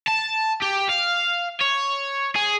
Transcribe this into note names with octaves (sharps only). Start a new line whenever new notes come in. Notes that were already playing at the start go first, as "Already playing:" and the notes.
A5
G4
F5
C#5
G#4